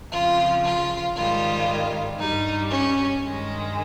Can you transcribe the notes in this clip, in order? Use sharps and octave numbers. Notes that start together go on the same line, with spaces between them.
F2 C#3 F3 F4
F4
G#2 D#3 G3 F4
G2 G3 D#4
C#4
G2 D#3 G#3